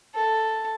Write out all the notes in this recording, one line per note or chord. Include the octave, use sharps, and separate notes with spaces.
A4